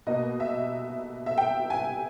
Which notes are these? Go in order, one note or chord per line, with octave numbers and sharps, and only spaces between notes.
B2 A#3 D#5
E5
E5
G5
G#5